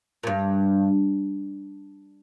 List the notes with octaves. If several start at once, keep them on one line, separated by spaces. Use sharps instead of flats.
A#2
G2